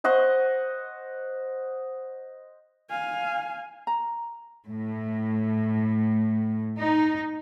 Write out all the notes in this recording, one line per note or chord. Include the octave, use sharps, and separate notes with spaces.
C5 D#5 F#5 C#6
F5 G#5
A#5
A2
D#4